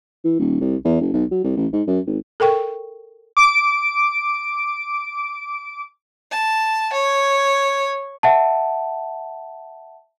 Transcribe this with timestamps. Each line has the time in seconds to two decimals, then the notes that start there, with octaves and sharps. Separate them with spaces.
0.25 E3
0.39 D#1
0.61 C2
0.85 E2
1.01 F#1
1.13 B1
1.31 F#3
1.44 C2
1.57 A1
1.73 G#2
1.87 F#2
2.07 G#1
2.40 A4 A#4 G5 C#6
3.37 D6 D7
6.32 A5
6.93 C#5
8.23 E5 F#5 A5